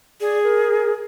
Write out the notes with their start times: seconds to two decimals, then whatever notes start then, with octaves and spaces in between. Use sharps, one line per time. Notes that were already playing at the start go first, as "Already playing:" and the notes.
0.20 G#4 D5
0.43 A#4